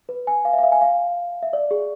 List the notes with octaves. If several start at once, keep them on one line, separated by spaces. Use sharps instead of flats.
B4
G#5
F5
E5
F5
E5
G#5
F5
E5
D5
G#4